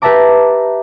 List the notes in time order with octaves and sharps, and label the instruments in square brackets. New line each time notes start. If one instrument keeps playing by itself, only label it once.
[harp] G4 B4 E5 A5 A#5 D6